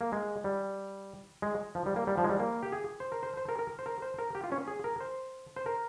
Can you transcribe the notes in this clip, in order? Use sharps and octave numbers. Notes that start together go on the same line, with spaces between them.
A#3
G#3
G3
G#3
F3
G3
A#3
G3
F3
G#3
G3
A#3
G4
G#4
C5
A#4
C5
C5
A#4
A#4
C5
A#4
C5
A#4
G4
F4
C#4
G#4
A#4
C5
C5
A#4